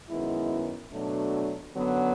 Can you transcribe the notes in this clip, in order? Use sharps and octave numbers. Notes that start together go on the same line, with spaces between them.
F#2 D#3 G#3 B3 E4
B2 F#3 A3 D4
F#2 D3 F#3 B3